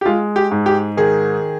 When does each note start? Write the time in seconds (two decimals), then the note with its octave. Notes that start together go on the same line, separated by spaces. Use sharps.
0.01 G4
0.05 G#3 F4
0.36 G4
0.51 G#2
0.66 G4
0.97 D#3 G#4